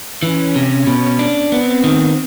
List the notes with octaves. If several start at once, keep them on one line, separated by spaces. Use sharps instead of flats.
E3 C#4
C3
B2
D4
B3 C4
D#3